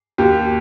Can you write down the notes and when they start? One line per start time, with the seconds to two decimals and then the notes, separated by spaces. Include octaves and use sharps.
0.18 D#2 G4